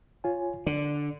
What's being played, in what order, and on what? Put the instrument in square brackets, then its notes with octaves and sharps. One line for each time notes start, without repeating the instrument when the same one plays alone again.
[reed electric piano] F4 C#5 G#5
[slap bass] D3 [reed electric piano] D5